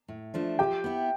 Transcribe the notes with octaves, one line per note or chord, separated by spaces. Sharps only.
A2
F3 A3 D4
F3 G4 G5
B3 E4